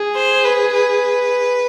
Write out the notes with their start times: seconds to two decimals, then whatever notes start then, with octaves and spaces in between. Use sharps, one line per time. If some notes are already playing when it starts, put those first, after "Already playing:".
Already playing: G#4
0.15 C5
0.44 B4
0.74 B4